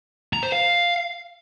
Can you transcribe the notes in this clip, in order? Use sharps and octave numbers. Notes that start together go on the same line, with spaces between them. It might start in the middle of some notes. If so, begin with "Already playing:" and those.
A#5
C5
F5